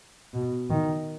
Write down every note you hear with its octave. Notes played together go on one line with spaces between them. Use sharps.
B2
D#3